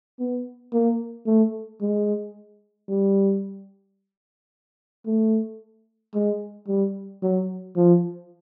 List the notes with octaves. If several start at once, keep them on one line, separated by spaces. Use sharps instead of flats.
B3
A#3
A3
G#3
G3
A3
G#3
G3
F#3
F3